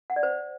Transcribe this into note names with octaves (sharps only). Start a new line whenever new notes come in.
F#5
D5
C5